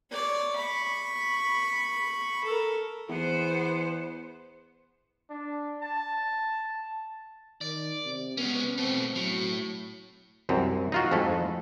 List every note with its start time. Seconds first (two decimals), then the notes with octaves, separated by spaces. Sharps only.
0.12 C#5 D5
0.56 B5 C#6
2.44 A4 A#4
3.09 E2 B3 C5
5.30 D4
5.82 A5
7.61 D#3 D5
8.05 C3
8.37 G#3 B3 C#4
8.78 B2 A3 C4
9.15 A2 F#3
10.49 C2 F#2 C4
10.92 D#4 F4 F#4
11.11 F2 G#2 A3 E4 A4